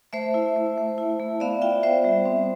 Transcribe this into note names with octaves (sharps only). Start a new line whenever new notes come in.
A3 C5 E5
E4
A3
A3
E4
A3
B3 D5 F5
F4 E5 G5
B3 C5 E5
G3
C4